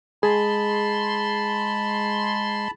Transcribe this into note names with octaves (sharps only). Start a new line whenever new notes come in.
G#3 G#4 A5 B5 C6